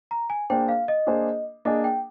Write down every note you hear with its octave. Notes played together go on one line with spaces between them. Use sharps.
A#5
G#5
A#3 D4 G#4 C5 G5
F5
D#5
A#3 D4 G#4 C5
A#3 D4 G#4 D#5
G5